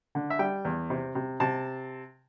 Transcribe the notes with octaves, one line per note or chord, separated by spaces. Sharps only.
D3
E5
G3 G5
E2
C3
C3
C3 A5